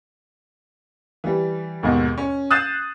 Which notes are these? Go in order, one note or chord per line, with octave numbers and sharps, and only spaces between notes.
E3 G3
D#2 G#2 B2
C#4
D#6 F#6 G6 A6 C7 E7